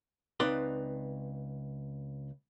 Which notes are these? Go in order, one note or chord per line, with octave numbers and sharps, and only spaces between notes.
C#2 C4 D#4 B4 D5 C6